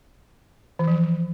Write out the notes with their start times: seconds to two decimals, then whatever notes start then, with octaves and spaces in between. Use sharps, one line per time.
0.79 E3
0.88 F3